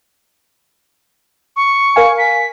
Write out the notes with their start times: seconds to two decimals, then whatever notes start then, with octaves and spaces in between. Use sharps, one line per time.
1.56 C#6
1.96 A#4 F5 G#5
2.18 B6